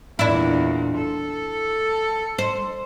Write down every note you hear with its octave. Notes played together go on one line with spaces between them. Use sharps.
E2 A#2 D4 E4
A4
C5